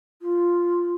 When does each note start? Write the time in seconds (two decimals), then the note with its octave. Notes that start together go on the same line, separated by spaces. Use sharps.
0.22 F4